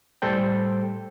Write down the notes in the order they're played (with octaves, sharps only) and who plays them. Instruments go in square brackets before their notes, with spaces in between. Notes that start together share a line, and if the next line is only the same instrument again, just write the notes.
[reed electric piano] A2 G3 A4 C5 G5